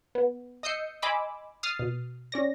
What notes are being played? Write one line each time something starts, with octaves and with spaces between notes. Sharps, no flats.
B3
D#5 D#6 E6 G6 C7 C#7
D#5 G#5 B5 C6 D6 E6
D#6 F6 A6 C7
B2
C#4 D5 A#6